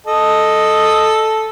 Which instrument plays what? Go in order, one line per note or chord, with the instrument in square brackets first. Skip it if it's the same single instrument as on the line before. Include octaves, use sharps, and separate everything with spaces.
[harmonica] A4 D#5